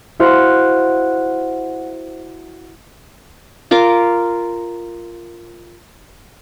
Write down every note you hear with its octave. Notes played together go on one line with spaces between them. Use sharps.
E4 F#4 C5 F5 F#5
F4 A#4 D6